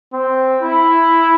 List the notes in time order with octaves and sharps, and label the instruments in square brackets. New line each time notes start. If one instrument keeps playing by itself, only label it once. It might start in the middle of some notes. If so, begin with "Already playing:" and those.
[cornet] C4
E4